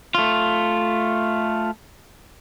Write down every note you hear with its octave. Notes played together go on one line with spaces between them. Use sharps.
A3 F4